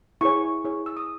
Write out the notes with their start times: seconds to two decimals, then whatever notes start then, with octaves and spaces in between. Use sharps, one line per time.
0.21 E4 G#4 C#5 C#6
0.65 E4 G#4 C#5
0.86 E6
0.97 D#6